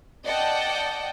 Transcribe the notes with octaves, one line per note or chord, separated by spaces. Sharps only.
D5 D#5 F#5 G5 A5